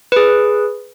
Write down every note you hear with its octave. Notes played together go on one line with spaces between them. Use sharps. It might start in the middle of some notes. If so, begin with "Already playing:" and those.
G#4 B4